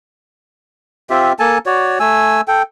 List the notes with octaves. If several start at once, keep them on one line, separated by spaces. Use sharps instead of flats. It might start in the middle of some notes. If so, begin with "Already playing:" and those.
C4 F4 G4 E5
A#3 A4 G#5 A5
F#4 C#5 D5
A3 G#5 E6
A4 G5